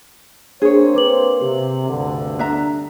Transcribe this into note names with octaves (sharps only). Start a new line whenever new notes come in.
A#3 C4 D4 G#4 C5 C#5
B4 D6 F#7
C3 G4
D2 G2 D3
D4 E5 A#5